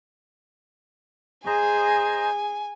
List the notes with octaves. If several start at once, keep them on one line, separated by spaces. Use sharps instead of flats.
G#4 C5 D#5 G#5 A#5